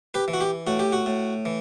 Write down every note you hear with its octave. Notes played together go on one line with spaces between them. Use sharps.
G4 B4
E3
F#4
G4
A2 F#4
G4
F#4
A2
E3